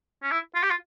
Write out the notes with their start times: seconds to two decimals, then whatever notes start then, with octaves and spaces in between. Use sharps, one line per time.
0.23 C#4
0.31 E4
0.55 F4
0.63 G4
0.70 F4